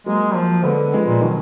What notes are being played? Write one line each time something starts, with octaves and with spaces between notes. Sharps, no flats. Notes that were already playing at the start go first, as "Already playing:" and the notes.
F#3 G#3 A#3
F3
D3 G#3 B3
F3 G#3
A#2
B2 D#3 F#3